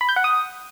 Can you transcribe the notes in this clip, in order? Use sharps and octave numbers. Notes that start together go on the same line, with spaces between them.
B5
G6
F#5
D#6